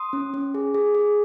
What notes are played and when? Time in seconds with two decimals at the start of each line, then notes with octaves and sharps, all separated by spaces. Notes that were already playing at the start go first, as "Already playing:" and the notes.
Already playing: C6 D#6
0.13 C#4
0.34 C#4
0.54 G#4
0.74 G#4
0.95 G#4